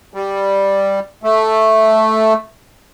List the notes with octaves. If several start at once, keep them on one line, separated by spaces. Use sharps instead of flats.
G3
A3